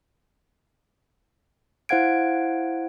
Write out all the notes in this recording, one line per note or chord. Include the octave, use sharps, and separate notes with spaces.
E4 C5 F5 F#5 G#6 D7